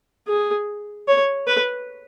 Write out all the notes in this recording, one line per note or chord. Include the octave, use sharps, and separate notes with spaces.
G#4
C#5
B4